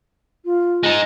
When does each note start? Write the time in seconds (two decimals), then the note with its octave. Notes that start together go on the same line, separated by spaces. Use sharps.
0.45 F4
0.83 G#3 D#4